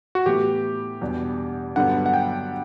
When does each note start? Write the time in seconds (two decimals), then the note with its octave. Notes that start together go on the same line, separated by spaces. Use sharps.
0.15 F#4
0.26 A2 E3 B3 E4 G4
1.01 E2 B2 G3 D4
1.76 G2 D3 F#3 B3 F#5
2.06 F#5
2.14 G5